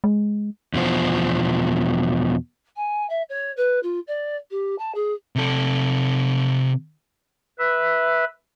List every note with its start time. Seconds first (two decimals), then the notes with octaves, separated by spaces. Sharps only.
0.04 G#3
0.74 E2 B2 F3 C5
2.76 G#5
3.09 E5
3.29 C#5
3.57 B4
3.83 F4
4.07 D5
4.50 G4
4.78 A5
4.94 G#4
5.36 C3 A4
7.59 B4 E5